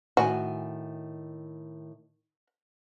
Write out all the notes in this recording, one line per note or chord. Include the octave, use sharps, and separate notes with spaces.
A2 D#3 F#4 G#5